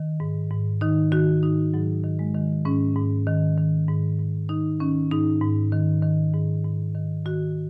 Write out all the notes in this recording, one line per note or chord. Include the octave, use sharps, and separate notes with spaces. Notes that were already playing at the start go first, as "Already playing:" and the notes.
Already playing: D#3
G#2
G#2
D#3 D#4
D#3 F#4
G#2 D#4
G#2 F#3
D#3
G#3
D#3
G#2 C#4
G#2
D#3
D#3
G#2
G#2
D#3 D#4
D#3 C#4
G#2 D#4
G#2
D#3
D#3
G#2
G#2
D#3
D#3 F#4